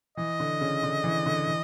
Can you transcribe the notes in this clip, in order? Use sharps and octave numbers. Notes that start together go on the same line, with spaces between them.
E3 D#5
D3
C#3
D3
E3
D3
E3